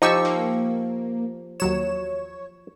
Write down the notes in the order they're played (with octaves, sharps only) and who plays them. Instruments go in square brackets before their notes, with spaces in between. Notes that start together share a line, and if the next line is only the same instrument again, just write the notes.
[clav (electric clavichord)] F3 G4 [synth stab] D#4 C#6 E6
[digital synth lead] A#3
[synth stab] D#2 F#3 E7 [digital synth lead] C#5